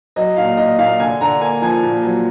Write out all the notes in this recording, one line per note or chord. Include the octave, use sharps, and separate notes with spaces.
F#3 D#5
A#2 F5
A#2 D#5
A#2 F5
D3 G#5
D3 A#5
A#3 G#5
F3 G#5
A#2
F#3